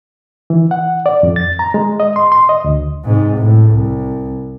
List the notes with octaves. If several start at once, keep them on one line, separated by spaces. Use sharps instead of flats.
E3
F#5
D5
F2
A6
A#5
G#3
D#5
C6
C6
D#5
D2
G#2 C3
A2
C2